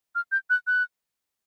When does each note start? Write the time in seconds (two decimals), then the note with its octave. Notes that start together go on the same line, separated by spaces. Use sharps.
0.15 F6
0.32 G6
0.50 F#6
0.67 F#6